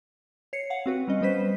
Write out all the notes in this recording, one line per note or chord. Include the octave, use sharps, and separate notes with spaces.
C#5 C7 C#7
F5 F#5
C4 F#4 B4
G3 C#4 D#5
G3 B3 B4 C5 B6